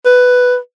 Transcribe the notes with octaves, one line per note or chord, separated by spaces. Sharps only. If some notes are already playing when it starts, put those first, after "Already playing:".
B4